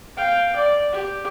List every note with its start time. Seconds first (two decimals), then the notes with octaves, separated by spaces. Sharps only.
0.17 F5 G5
0.56 D5
0.92 G4